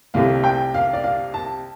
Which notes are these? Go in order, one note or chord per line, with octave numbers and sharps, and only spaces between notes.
C2 C3 A3 F5
G5
F5
D5
F5
A5